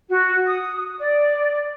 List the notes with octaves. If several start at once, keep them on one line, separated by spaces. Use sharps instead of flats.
F#4
D#6
D5